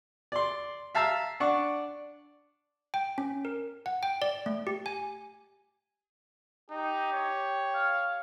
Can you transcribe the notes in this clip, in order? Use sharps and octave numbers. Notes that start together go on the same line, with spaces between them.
D5 C6
E5 F5 A5 A#5 E6
D4 D5 F#5 C#6
G5
C#4
A#4
F#5
G5
D5
A3
G4
G#5
D#4 G4
C#5
F5